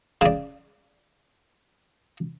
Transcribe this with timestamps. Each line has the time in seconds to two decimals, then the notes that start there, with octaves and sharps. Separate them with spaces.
0.21 C#3 D5